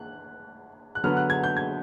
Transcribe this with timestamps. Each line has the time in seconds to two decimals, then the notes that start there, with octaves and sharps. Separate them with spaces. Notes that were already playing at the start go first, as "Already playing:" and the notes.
Already playing: F#6
0.95 F#6
1.04 D3 F#3 B3 F6
1.17 F#6
1.30 G#6
1.44 G6
1.57 G#6